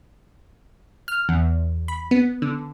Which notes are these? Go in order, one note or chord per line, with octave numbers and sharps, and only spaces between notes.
F6
E2
B5
B3
D3